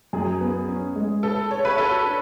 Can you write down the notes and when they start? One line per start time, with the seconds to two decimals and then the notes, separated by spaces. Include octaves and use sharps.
0.13 F#2 G#4
0.41 B3
0.68 C#4
0.96 G#3
1.23 A4 B4
1.51 G#4 C#5
1.65 B4
1.78 F#4 A4
2.05 D4